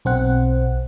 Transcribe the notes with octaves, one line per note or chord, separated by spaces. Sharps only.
B1 C4 F#5